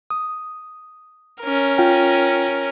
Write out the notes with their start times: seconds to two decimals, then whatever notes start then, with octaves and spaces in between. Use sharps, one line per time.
0.10 D#6
1.42 C#4 A#4
1.78 F4 G5